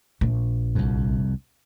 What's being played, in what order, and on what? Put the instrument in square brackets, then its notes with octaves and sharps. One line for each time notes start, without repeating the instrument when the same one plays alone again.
[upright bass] A#1
[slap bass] C2 F2